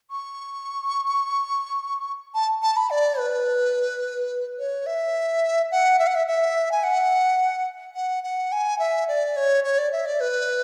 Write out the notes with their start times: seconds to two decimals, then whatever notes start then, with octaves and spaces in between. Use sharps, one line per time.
0.11 C#6
2.35 A5
2.62 A5
2.77 B5
2.90 D5
3.19 B4
4.59 C#5
4.86 E5
5.71 F#5
5.99 E5
6.07 F#5
6.15 E5
6.27 E5
6.72 G#5
6.83 F#5
7.95 F#5
8.24 F#5
8.52 G#5
8.79 E5
9.08 D5
9.36 C#5
9.64 C#5
9.78 D5
9.92 E5
10.06 D5
10.20 B4